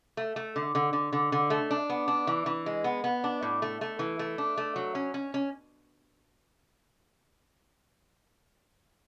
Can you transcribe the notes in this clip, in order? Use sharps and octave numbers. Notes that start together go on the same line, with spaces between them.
A3
A3
D3
D3
D3
D3
D3
A3
D4
B3
D4
E3
E3
G#3
B3
B3
D4
A2
A3
A3
E3
A3
D4
A3
F#3
C#4
C#4
C#4